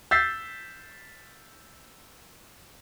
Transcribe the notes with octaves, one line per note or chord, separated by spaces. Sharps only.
E6 G6 A6 B6 C7